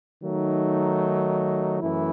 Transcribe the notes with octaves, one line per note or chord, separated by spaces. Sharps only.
D#3 F#3 A3 D#4
F#2 E3 A3 E4